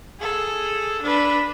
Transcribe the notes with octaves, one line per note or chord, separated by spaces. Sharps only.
G#4 A4
D4 B4